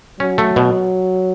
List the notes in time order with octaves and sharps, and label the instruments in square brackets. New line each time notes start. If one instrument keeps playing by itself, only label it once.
[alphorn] F#3 [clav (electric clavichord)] C#4
[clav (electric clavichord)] A3
B2